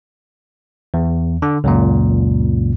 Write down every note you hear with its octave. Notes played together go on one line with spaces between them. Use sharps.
E2
D3
C#2 F#2 A#2